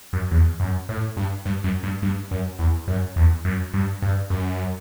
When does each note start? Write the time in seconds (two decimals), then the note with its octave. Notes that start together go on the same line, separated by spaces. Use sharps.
0.13 F#2
0.31 E2
0.60 F#2
0.89 A2
1.17 G2
1.46 G2
1.64 F#2
1.83 G2
2.02 G2
2.31 F#2
2.59 E2
2.88 F#2
3.16 E2
3.45 F#2
3.73 G2
4.02 G2
4.30 F#2